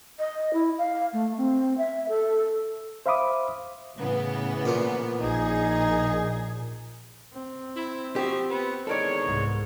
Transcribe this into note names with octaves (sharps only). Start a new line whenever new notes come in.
D#5
E4
F5
A3
C4
E5
A4
C5 E5 F5 B5 D6 D#6
A2 C#3 E3 B3
A#2 F3
A#1 D#4 G#4
C4
E4
F3 F#4 G4
B3
E2 D#3 G#3 A4 A#4 C#5 D5
C2 G#2